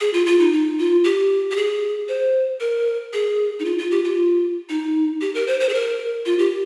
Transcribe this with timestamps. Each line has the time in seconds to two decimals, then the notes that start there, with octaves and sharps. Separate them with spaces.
0.01 G#4
0.14 F4
0.26 F4
0.40 D#4
0.53 D#4
0.78 F4
1.04 G4
1.51 G4
1.56 G#4
2.08 C5
2.60 A#4
3.13 G#4
3.59 D#4
3.65 F4
3.78 F4
3.91 G4
4.04 F4
4.69 D#4
5.21 G4
5.35 A#4
5.47 C5
5.60 C5
5.69 G#4
5.74 A#4
6.26 F4
6.39 G4